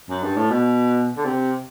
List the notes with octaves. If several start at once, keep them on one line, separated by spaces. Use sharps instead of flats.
F#2
G2
A2
B2
D3
C3